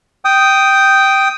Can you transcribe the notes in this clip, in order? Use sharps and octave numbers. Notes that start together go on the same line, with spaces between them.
G5 D#6